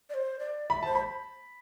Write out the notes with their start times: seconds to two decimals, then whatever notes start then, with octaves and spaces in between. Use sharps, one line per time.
0.10 D5
0.14 C5
0.39 D5
0.70 E5 B5
0.83 C5 A5
0.95 B5